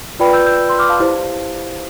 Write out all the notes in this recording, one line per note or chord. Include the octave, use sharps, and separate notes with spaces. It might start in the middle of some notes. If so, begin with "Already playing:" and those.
F4 B4 D5 G5 B5
E6 G6
E6 G6
C6 E6
D6 F6
F5 A5
E4 G4 C5